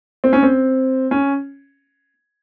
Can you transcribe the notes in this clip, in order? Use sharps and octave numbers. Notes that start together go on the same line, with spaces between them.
C4
C#4
C4
C#4